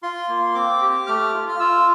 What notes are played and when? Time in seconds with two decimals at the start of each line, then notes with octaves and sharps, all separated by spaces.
0.03 F4 C6
0.29 A#3
0.55 C4 D6
0.82 G4
1.07 A3 F6
1.34 F4
1.49 F6
1.60 F4 E6